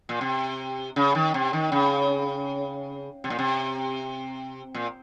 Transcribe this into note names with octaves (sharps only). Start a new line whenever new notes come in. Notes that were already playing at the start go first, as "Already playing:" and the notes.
A#2
C3
C#3
D#3
C3
D#3
C#3
C3
A#2
C3
A#2